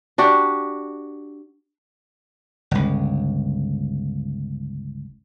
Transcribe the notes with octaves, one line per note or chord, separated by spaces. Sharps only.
D4 F#4 G4
G1 C#2